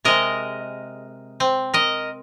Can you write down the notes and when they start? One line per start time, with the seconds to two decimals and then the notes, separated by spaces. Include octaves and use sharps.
0.05 C3 G#3 A#4 D#5
1.40 C4
1.74 A#4 D#5